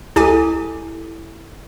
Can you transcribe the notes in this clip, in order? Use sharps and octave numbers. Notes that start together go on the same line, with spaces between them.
C#2 E4 G4 A4 G#5